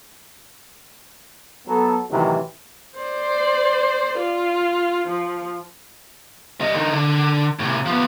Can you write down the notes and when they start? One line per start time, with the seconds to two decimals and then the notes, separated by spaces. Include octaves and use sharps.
1.68 F#3 B3 A4
2.11 A2 C3 D#3 E3 F#3
2.99 C5 D5
4.19 F4
5.08 F3
6.61 G3 D#5
6.75 D3 D#4
6.93 D3
7.59 A2 C3
7.86 F3 B3